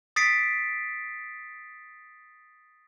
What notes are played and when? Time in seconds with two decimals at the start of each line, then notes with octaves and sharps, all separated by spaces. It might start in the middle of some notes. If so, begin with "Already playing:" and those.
0.16 D#6 A6 B6 C7 D7